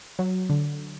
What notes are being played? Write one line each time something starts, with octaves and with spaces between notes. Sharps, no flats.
F#3
D3